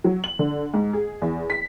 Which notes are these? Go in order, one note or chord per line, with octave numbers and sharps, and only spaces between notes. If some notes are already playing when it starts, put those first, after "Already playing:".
F#3
F#7
D3
G#2
G#4
E2
B6